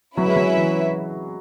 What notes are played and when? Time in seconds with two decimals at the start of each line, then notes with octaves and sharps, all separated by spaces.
0.17 F#3 C#4 E4 B4 E5
0.26 G#3
0.36 F#3
0.57 E3